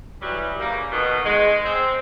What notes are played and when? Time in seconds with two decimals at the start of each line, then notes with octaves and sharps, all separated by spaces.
0.21 E3 F#3 G3
0.60 C#3 G3 A#3
0.92 B2 D#3
1.24 G#3
1.64 C4